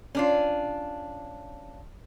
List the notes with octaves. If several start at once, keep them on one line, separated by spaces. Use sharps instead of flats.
C#4 D4 F4